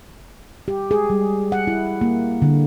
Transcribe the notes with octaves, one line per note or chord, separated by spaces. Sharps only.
G4
G#4
G3
F#5
E4
A#3
D3